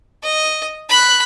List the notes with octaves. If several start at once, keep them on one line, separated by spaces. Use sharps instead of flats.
D#5
B5 F#6